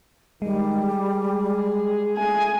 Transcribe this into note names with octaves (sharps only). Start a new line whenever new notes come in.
D#3 G3 G#3
G#4
A3 G#4 G#5